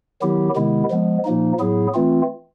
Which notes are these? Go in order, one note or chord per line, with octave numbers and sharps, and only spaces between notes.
D#3 F#3 B3 E4 G4
C3 D#3 G#3 B3 E4
F3 G#3 B3
A#2 F3 A#3 D#4
A2 F#3 B3 E4 G#4
E3 A3 C4 F4